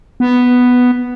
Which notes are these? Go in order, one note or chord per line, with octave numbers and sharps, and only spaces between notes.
B3